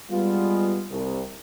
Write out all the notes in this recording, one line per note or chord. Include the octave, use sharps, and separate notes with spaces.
G3 G#3 B3 F4
C2